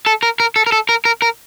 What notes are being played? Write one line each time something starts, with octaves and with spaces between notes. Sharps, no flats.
A4
A#4
A#4
A4
A#4
A4
A#4
A#4
A#4